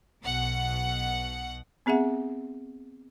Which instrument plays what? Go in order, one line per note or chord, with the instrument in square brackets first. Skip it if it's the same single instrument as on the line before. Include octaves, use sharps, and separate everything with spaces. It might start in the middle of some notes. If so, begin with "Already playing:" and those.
[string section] B1 B2 F#5
[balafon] B3 C4 G#4 E5 F#5